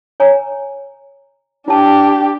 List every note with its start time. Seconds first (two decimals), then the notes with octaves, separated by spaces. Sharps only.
0.20 C#5 G#5 A#5
1.68 D4 E4 G4 A5